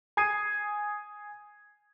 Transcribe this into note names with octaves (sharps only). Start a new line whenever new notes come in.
G#5 D#6 G#6 C7 D#7